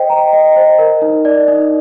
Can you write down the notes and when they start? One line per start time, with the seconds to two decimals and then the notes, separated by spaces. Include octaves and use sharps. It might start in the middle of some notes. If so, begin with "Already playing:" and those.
Already playing: C5 D#5 G5
0.10 A#5
0.33 D#5
0.56 C5
0.79 A#4
1.02 D#4
1.25 D5
1.48 D#4